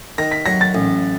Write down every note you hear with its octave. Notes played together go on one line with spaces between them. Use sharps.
D#3 A#6
B6
F#3 A#6
A6
A1